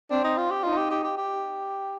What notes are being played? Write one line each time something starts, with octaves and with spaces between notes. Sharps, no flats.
C4 D4
D#4
F4
G4
D#4 F4
G4
G4
G4
G4